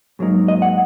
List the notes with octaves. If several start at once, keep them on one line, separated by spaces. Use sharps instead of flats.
G#2 F#3 A#3 D#4
D#5
F#5